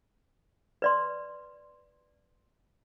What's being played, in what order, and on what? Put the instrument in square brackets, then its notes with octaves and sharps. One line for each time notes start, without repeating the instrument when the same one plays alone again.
[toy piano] B4 D5 C6